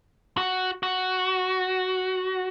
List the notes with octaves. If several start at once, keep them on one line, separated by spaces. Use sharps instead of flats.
F#4
F#4